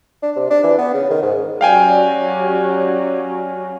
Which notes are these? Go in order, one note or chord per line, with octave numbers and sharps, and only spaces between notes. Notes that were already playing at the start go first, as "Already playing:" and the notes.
D4
C3
D4
E3
B3
C#3
D#3
G#2
F#3 C#4 G4 D5 F5 G5 G#5